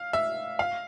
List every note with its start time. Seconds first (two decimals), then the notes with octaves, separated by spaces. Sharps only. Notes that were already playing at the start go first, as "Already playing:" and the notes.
Already playing: F5
0.13 E5
0.59 F5